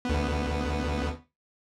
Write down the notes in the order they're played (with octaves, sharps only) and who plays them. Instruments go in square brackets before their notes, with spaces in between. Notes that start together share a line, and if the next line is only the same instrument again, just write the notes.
[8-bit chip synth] D2 B3